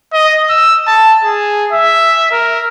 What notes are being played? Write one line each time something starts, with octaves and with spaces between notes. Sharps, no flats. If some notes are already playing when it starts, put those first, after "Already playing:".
D#5
E6
A5
G#4
E5
A#4